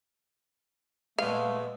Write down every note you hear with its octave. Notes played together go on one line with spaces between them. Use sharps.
A#2 G#3 A3 B3 F5